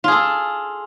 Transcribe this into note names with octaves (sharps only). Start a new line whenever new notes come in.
F4 G#4 A4